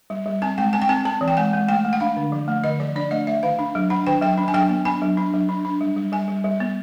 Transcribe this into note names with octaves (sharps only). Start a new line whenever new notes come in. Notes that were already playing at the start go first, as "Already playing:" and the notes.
G3
G3
C4 G#5
G#3 G5
C4 G#5
G5
C4 G#5
C4 A5
E3
G5
G#3 G#5
G#3
A3 G5
A3
F#5
D4 F5
D3
F3
A3
D3 D#5
F3 D5
D4 D5
A3 D#5
A3 E5
D#3 F5
D4
F#3
D4 F#5
D#3 G5
F#3 G5
D4
G#5
F#3 G5
B3
D4 G#5
F#3
D4
F#3
D4
D4
G3
G3
G3 G#5
G3
G3
B3